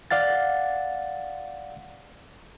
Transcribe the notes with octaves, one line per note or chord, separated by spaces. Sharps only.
D5 F5 F#5 A6